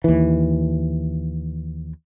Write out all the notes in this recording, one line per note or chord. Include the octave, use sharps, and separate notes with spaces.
D#2 E3